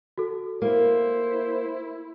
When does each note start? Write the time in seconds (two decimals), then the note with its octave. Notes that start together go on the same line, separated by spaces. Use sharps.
0.18 F#4 A4
0.62 A#3 E4 C5